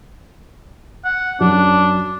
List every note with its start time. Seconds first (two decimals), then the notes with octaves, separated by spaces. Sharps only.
1.05 F#5
1.41 F#2 D4